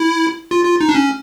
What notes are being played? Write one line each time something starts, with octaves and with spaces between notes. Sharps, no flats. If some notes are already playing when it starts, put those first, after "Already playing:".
Already playing: E4
F4
F4
D#4
D4
C#4